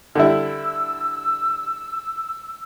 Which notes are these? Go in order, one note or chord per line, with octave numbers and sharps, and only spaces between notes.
D3 G3 E4 E6